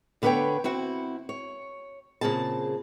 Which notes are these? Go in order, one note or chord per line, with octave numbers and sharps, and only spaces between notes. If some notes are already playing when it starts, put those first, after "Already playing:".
D2 D3 B3 B4 C#5 G5
C4 E4 F#4
C#5
A#2 C#3 C4 G#4 A5